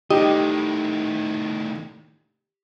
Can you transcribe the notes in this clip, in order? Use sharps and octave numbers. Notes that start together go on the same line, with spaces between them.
A2 D#3 D#4 G4 D#5